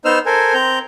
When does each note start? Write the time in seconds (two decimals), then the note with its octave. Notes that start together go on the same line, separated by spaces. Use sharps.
0.05 B3 D#4 C5 E6 F6
0.26 A4 A#4 C5 G#5
0.54 C4 A#5 G6